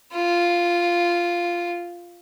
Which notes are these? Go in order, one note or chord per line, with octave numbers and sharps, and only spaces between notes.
F4